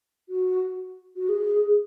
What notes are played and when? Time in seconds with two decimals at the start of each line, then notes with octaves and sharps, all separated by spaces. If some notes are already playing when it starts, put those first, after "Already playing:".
0.29 F#4
1.15 F#4
1.28 G#4